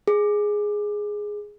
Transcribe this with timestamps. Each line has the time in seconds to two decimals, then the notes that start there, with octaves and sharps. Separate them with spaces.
0.08 G#4